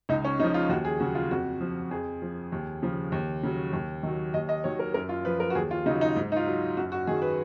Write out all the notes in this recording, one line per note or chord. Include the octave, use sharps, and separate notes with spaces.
C#2 D#4
C#4
C#3 F3 D#4
F4
D#2 F#4
G#4
C#3 F#3 F#4
F4
F2 F#4
F3
F2 G#4
F3
D#2
C#3 F3
D#2
C#3 F#3
D#2
D#3 F#3
D#2 D#5
D#5
D#3 F#3 C#5
A#4
F#2 A#4
F4
F3 B4
A#4
F#4
D#2 G#4
F4
C#3 F#3 D#4
D#4
G#2
D#4
F4
F#3
F#2 F#4
F#4
D#3 F#3 G#4
B4